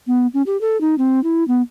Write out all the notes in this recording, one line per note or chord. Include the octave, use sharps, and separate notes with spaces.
B3
C#4
G4
A4
D#4
C4
E4
B3